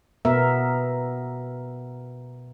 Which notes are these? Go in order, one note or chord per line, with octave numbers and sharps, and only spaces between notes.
B2 B3 A#4 E5